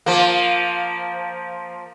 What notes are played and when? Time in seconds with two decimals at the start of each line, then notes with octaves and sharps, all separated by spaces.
0.06 F3 A#3